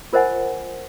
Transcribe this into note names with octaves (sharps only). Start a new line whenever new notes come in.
F4 A#4 C5 D#5 F#5 G#5